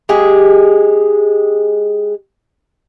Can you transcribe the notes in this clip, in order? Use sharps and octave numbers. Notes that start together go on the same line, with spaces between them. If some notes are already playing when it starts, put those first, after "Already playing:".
G#3 G4 G#4